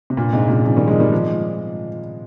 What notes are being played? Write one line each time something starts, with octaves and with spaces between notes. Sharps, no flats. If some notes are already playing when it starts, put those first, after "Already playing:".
C3
G2 A#2
G#2 C3
A#2 C#3
C#3 F3
D#3 G3
F3 G#3
D#3 G3
F3 G#3